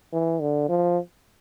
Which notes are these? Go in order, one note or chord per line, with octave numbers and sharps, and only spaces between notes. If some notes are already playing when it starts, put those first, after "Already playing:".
E3
D3
F3